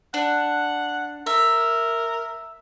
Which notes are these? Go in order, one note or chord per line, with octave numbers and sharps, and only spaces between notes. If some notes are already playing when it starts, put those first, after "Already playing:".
D4 F#5
A#4 E5